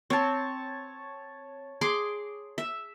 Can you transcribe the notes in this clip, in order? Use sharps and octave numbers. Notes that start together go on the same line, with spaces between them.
C4 C#5 A5
G#4 C6 D6
E5